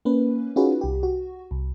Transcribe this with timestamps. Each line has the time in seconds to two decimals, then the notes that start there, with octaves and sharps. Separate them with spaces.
0.05 A#3 C#4 B4
0.56 C#4 D#4 F4 F#4 G#4 B4
0.81 C2 G4
1.03 F#4
1.51 C2